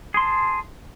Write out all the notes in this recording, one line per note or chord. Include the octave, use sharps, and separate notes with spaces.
G#4 A5 C6